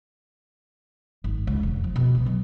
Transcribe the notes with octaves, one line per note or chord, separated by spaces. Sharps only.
G#1
C#2
E1
F3
B2
C2
F#3